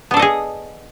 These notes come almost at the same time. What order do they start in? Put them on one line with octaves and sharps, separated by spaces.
B3 D4 A4 D#5 G#4